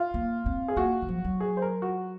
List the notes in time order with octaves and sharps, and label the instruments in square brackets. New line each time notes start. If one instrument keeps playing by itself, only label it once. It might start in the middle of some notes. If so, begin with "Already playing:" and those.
Already playing: [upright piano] F4
[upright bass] A#3
C4
[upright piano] G#4
[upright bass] A#3 [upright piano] F#4
[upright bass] D#3
F3
F#3
[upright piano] G#4
C5
A#4
F#4